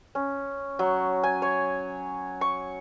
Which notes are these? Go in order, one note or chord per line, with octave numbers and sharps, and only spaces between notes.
C#4
F#3
G#5
C#5
C#6